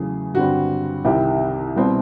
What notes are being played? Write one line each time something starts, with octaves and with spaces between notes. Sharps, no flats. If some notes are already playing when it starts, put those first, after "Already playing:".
Already playing: E2 C#3 F#3 A3 G#4
G2 D3 G3 C4 F#4
C2 C3 D#3 G4
C2 B2 G3 C4